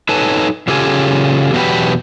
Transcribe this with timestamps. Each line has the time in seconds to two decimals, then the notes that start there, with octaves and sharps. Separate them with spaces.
0.09 D#4 A4 B4 C#5 G#5 A5
0.68 C#3 F4 G4 A4 D#5 G#5
1.53 E2 B2 F#3 D#4 G4 B4